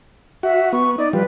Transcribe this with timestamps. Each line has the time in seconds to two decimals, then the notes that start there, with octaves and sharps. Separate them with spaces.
0.43 F#4 E5
0.73 B3 C#6
0.98 D#4 D5
1.13 F3 G3 B4